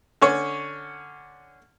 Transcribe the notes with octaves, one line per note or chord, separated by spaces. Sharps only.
D3 C#4 C#5